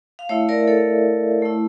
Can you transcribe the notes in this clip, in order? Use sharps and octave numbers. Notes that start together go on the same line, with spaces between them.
F5
A3 E4 C#5 E5
A#4 D5
A#4
A4 C#5
A3 E4